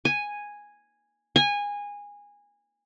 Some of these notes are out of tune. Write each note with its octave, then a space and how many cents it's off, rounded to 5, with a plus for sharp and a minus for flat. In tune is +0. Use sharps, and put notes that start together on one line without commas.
G#5 -5
G#5 -20